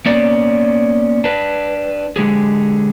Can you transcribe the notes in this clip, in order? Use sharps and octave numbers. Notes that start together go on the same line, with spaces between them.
A#3 B3 C#4 D5
D4 B4
D3 G#3 G4 G#4